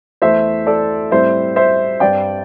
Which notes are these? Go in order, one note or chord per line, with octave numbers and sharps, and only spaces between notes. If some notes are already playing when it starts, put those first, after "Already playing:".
E2 E3 A3 C5 E5
A4 D5
A2 G3 C4 C5 E5
C5 E5
G2 G3 C4 D5 G5